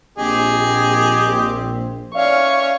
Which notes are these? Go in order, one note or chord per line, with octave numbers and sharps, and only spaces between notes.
A#1 C4 G4 G#4 D#5
C#4 C#5 D5 E5 F5 C#6